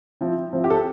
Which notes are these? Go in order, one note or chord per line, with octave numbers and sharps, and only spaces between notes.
F3 C4 E4
F3 C4 E4
G4
A4